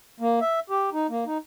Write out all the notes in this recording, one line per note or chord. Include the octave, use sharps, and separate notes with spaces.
A#3
E5
G4
D#4
A#3
D#4